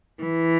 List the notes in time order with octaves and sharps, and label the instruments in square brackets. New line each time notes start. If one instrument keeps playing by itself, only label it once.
[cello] E3